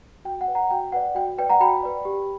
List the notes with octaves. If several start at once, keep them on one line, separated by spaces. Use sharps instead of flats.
F#4 G5
F#5
B4 D5
F#5 A#5
F#4 G5
B4 D5 F#5
F#4 G5
B4 D5 G5
F#5 A#5
F#4 G5 B5
B4 D5
G4